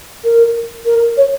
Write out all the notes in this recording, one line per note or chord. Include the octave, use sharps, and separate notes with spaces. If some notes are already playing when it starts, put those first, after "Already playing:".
A#4
A#4
C#5